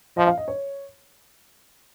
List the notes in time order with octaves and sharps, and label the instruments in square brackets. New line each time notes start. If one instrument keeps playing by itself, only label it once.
[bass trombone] F3 [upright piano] D#5
[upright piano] F5
D#5
C#5